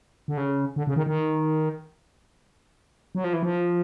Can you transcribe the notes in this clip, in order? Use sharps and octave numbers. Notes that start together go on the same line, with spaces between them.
D3
C#3
D3
C#3
D#3
D#3
F#3
F3
E3
F3